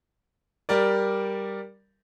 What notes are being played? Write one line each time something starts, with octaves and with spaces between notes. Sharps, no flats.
G3 G4 A#4 D5